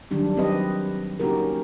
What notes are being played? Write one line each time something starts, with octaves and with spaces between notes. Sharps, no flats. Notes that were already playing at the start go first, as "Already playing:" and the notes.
D#3 F#3 G3 D4 G4
F#3 C4 G4 B4 D#5
A#3 C#4 D#4 F#4 G4 A#4